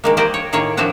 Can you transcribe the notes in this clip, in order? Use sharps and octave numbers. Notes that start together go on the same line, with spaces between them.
D#3 G#3 A#3
A#3 G4 C5 D5 D#5
C#5
A2 D#3 A#3 G#4 C#5
F3 A3 C4 D4 F#4